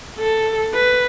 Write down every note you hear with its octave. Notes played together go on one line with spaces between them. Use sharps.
A4
B4